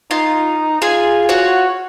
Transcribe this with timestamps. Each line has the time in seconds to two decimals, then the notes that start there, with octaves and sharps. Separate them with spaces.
0.11 D#4 F4
0.82 F4 G#4 G#5
1.29 F#4 C#5